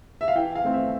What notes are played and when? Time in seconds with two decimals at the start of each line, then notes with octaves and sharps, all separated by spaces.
0.21 E5
0.28 F5
0.36 E3 G5
0.56 F5
0.64 A3 C4
0.74 E5